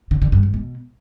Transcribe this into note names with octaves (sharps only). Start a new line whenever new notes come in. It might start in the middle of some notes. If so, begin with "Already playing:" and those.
D3
D3
G2
G#2
B2